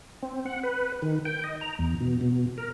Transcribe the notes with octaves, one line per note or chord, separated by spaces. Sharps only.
C4
F#5
B4
D#3
G5
D#5
A#5
E2
B2
B2
A#4